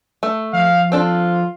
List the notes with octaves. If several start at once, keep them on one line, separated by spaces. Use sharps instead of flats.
A3
F3 F5
C4 D4 F4 A4